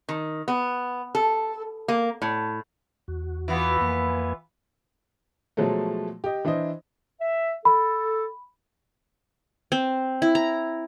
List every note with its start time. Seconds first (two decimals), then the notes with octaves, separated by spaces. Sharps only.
0.09 D#3
0.48 B3
1.15 A4
1.88 A#3
2.22 A2
3.08 E2 F#4
3.48 E3 B3 F4
3.81 F2 A#3 G#5
5.57 B2 F3 F#3 G#3 A3
6.24 G4 D#5
6.45 E3 D4 E4 C5 D#5
7.21 E5
7.65 A4 B5
9.72 C4
10.22 E4
10.35 A#5